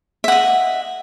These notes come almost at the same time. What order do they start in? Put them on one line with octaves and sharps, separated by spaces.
E5 F#5 D#5